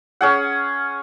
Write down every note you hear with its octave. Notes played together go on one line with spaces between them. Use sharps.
C#4 G#4 F#5